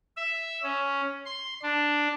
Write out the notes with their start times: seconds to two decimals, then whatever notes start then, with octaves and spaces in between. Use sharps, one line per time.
0.17 E5
0.63 C#4
1.25 C6
1.62 D4